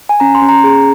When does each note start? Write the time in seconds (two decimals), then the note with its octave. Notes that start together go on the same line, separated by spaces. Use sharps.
0.09 G#5
0.20 C#4 A#5
0.35 C6
0.42 C#4
0.49 A#5
0.64 G#4